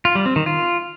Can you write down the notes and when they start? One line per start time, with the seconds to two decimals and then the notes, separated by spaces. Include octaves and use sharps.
0.05 F4
0.15 G3
0.26 C4
0.36 D#3
0.46 F4